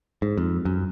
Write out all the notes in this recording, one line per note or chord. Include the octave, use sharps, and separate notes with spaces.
G#2
F2
F#2